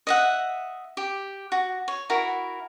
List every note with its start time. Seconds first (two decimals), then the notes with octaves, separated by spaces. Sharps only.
0.07 D#5 E5 F#5
0.97 G4
1.52 F#4
1.88 C#5
2.10 E4 F#4 A#4